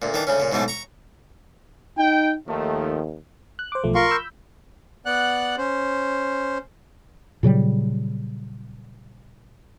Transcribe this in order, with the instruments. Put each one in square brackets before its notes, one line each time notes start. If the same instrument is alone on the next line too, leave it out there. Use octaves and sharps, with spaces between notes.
[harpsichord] D2 A#2
D#3 E3 D4
D2 C#3 C#4
A#2 C#3
G#2 B2 E3 F#3 A3
A#5 C#6
[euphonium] D#4 [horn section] G5
[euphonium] D#2 [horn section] D#3 F3 A3
[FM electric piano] F#6
C5 D6
B1 F3 A3
[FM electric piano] F4 [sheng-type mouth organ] A#4 C6 C#6
[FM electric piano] B5 E6 G6
[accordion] B3 D5 F#5 F#6
C#4 C5
[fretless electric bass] A#2 C#3 F#3 G3